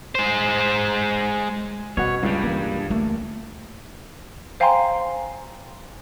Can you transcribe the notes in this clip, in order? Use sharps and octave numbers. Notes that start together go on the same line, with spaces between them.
G#3 C5
B2 C#4 C#5 F#5
C#2 G2 G3
E3 A#3
D2 A3 A#3
C5 F5 G5 G#5 A#5 C6